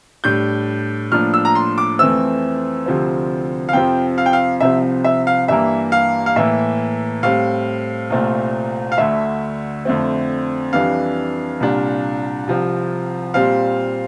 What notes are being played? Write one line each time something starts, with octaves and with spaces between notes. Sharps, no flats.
A2 G3 D4 G6
A2 F3 A#3 D4 F6
E6
A#5
C6
D6
F2 E3 A3 C4 E6
D2 C3 F3 C4
F5
F2 C3 F3 C4 G5
F5
G5
F5
C2 C3 F3 C4 E5
E5
F5
G2 E3 A#3 E5
F5
F5
A2 E3 A#3 E5
A2 G3 C4 F5
C2 A#2 A3 C4
F5
D2 D3 A3 E5
F2 D3 A3 C4
F2 E3 G3 D4 F5
C2 A#2 G3 D4
C2 C3 F3 C4
A#2 G3 C4 F5